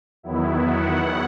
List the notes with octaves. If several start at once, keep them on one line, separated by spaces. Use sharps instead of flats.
E2 D#3 F#3 B3 E4
F#5